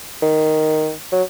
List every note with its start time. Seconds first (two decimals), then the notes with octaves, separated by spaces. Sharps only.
0.22 D#3
1.12 F#3